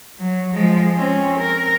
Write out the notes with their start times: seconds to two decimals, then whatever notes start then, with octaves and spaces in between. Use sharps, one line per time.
0.19 F#3
0.53 F3 G#3
0.95 C4 C#4
1.39 A#4